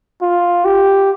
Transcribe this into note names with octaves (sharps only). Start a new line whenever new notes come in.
F4
G4